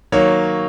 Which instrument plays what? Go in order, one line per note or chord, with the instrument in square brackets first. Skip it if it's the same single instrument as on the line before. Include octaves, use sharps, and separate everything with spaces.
[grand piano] D#3 F#3 A#3 C#5